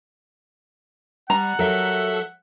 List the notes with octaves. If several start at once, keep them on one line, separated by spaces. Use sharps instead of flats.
G3 F#5 A#5
F#3 G3 A4 A#4 E5